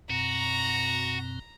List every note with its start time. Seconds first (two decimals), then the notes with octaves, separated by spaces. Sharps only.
0.10 F#2 B2 C4 F#4 A#5